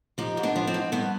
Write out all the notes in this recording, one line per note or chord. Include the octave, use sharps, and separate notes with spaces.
F3 D#4 G4
G#2
B3 D4
F3
C4
G#2
G2 B3